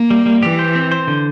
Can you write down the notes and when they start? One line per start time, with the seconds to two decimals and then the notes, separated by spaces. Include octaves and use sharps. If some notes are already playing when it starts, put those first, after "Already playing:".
Already playing: A#3
0.10 G3
0.26 G3
0.43 E3 G4
0.59 C5
0.75 C4
0.91 C5
1.08 D3